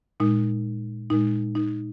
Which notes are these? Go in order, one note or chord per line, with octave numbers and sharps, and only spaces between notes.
A#2 G#3 D#4
A#2 G#3 D#4
D#4